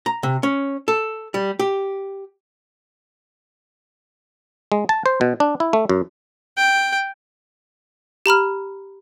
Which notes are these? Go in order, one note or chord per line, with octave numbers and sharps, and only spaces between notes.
A#5
C3
C#4
A4
G3
G4
G#3
A5
C5
B2
D4
E4
A3
F#2
G5
G4 A#5 B5 F6